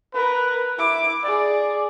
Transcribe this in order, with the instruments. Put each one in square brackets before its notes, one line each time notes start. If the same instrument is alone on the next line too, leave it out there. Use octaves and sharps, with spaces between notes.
[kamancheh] A#4 [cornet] B4
[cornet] E4 [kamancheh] D6
[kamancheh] G#4 [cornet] D5